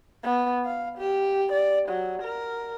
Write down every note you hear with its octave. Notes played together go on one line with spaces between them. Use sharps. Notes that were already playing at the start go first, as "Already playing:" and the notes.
B3
F5
G4
D5
F#3
A#4